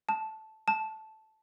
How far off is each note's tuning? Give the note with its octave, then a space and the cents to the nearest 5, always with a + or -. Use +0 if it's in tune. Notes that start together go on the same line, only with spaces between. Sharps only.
A5 -5
A5 -5